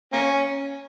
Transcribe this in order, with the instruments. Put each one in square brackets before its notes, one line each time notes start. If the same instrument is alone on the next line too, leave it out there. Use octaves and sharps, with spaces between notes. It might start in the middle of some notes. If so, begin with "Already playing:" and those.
[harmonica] A#3 C#4